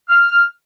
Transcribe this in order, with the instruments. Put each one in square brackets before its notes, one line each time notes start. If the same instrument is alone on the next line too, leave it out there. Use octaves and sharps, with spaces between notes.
[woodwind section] F6